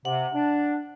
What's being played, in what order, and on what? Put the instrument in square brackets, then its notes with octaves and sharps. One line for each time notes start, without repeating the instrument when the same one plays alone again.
[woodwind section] C3 [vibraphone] F#5
[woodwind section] D4